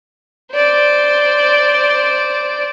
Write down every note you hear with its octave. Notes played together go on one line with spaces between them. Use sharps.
C5 D5